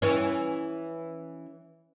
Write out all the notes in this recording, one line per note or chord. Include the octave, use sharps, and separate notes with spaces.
E3 C#4